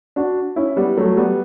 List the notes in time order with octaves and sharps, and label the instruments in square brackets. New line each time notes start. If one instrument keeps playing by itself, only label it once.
[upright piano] D4 F#4
C#4 E4
G3 B3
F#3 A3
G3 B3